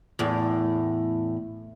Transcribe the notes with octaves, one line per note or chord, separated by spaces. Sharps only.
E2 A2